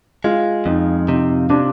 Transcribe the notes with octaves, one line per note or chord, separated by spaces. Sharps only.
G#3 F4
F2 D#4
C3 D#4
C3 D4